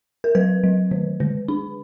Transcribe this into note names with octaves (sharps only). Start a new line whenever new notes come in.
A#4
F#3 B4
F#3
D#3
D3
D4